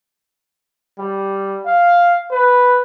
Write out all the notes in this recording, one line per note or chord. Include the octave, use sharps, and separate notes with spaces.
G3
F5
B4